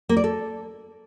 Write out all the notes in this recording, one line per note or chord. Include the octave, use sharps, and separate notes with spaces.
A#3
D5
A4